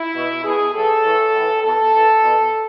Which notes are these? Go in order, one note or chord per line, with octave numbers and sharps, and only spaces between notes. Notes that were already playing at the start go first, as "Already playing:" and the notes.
Already playing: E4
B2
B2 G#4
A2 E3 A4
A2 E3
A2
E3
B2 A4
A2 E3
B2